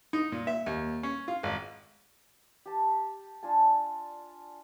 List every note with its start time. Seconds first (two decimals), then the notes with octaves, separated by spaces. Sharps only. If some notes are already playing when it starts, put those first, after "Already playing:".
0.13 D#4
0.32 A#2
0.47 E5
0.66 D#2
1.03 C#4
1.28 F4
1.43 G#1
2.66 G4 A5
3.43 D4 F4 G#5 A5